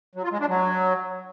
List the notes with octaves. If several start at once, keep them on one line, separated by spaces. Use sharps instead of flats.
F#3
F4
G#3
D4
F#3